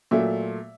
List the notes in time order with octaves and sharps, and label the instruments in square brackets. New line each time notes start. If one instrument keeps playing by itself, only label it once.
[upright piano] A#2 F#3 A3 E5